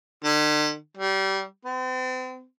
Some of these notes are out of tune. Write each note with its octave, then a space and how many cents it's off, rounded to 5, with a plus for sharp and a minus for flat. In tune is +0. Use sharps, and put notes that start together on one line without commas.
D3 +45
G3 -25
C4 -40